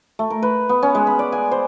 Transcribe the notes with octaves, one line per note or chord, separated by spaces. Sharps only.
A3
A#4
B4
B3
C#4
G#3
B5
D5
G#5
C5